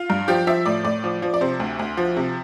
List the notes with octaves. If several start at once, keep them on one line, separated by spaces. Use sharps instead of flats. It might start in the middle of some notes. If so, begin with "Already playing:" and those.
Already playing: F4
G2
F3 G4
F3 E5
A2 D5
A2 D5
F3
F3
D5
C3 C5
D2
D2
F3
C3